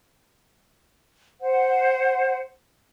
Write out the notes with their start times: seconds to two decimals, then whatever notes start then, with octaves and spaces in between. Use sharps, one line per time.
1.41 C5 F#5